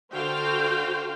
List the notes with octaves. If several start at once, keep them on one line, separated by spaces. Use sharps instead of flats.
D3 F#4 C5 F5 G5